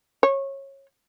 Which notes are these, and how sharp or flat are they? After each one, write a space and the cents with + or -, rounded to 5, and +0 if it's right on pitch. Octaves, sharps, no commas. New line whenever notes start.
C#5 -20